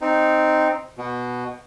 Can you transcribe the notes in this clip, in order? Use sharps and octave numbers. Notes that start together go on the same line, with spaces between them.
C4 D#4
B2